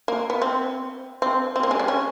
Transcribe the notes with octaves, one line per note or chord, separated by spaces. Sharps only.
A#3
B3
C4
C4
C4
A#3
G#3
G3
C#4